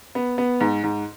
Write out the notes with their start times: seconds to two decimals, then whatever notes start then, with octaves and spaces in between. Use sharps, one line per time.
0.15 B3
0.38 B3
0.60 G#2
0.83 G#2